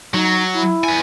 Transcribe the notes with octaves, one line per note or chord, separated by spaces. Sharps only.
F#3 D#4
E4
B3 G#5